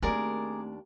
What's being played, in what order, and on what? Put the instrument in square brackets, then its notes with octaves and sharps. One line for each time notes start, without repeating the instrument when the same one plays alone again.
[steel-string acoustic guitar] D#2 D4 [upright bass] A3 C4 [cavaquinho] G#4 A#4 D5